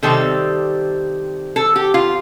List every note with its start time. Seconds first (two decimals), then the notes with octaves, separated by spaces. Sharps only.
0.02 C3 D#3 G3 C4 A4
1.56 A4
1.76 G4
1.94 F4